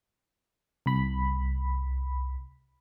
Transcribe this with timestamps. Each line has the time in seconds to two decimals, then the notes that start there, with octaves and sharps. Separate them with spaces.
0.86 C2 B5